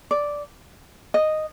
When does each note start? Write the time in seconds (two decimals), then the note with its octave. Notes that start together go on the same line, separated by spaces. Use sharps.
0.11 D5
1.14 D#5